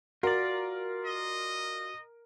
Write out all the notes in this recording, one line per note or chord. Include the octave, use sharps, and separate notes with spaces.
F4 F#4 A#4 D5
D#5